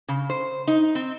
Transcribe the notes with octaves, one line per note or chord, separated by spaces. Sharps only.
C#3
C5
D#4
C4